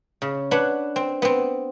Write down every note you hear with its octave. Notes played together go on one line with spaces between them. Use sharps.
C#3
D4 B4 C#5 F#5
C4
B3 C4